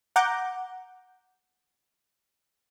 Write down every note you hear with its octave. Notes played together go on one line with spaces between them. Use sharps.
F#5 A#5 D6 G6